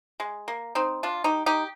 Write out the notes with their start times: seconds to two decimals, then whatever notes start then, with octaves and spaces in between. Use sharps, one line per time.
0.20 G#3
0.48 A#3
0.75 C4 D#4
1.03 D4 F4
1.24 D#4 G4
1.46 D#4 G4